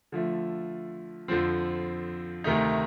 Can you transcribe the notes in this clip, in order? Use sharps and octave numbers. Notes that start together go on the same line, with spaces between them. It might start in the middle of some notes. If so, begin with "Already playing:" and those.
D3 F3 A3
F2 D3 F3 C4
D2 C3 D#3 A3 D#4